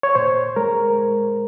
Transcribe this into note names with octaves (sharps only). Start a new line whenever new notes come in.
C#5
A#2 C5
G#3 A#4